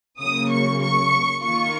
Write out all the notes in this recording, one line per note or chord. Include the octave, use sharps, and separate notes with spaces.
C#3 F#3 A#3 D#6
C#6
C#6
D#3 A#3 F4 C#6